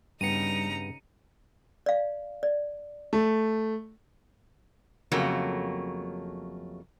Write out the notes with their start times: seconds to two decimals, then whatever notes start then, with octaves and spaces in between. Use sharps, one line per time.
0.21 G2 C#3 G3 B3 D#4 A#5 C#7 D#7
1.86 D5 F5
2.43 D5
3.13 A3
5.12 F2 C#3 F#3 A3 A#3